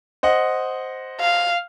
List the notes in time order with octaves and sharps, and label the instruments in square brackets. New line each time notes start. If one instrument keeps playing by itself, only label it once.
[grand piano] C5 D#5 F#5
[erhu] F5